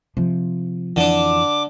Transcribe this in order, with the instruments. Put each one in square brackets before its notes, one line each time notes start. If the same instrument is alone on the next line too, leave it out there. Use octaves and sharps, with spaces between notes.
[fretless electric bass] C3 [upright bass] F3
[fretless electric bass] F2 E3 [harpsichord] D3 D4 [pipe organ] D6